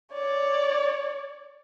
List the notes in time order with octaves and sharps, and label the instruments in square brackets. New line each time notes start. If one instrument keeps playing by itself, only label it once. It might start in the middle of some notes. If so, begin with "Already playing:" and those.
[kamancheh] C#5 D5